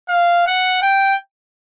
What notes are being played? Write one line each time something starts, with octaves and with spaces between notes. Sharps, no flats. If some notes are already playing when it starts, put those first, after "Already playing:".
F5
F#5
G5